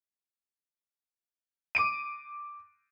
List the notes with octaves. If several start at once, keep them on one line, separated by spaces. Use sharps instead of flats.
D6 D7 D#7